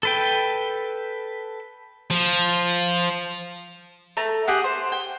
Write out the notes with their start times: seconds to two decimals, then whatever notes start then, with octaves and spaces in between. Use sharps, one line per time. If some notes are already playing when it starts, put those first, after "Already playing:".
0.03 A4 B4 G5
2.11 F3
4.17 A3 A#5
4.48 G4 G#4 F#5
4.64 C5
4.92 G5